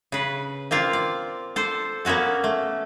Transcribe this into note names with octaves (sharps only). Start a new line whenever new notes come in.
C#3 B4
A#3 C4 F4 D5
D5
A4 C5 D5
A#3 B3 C#4 F#4 A4
A3